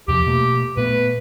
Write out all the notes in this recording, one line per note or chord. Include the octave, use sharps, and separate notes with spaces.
E2 C3 F3 G4
B2 A3 A#3
A#2 A3 B3 B4